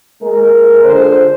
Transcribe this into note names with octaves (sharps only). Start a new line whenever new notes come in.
G#3 A#3 A#4
D3 F4 G#4 C5